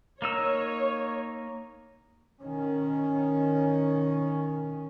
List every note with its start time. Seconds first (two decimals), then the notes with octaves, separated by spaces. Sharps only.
0.22 A#3 D#4 C#5 E6
2.42 D#3 C#4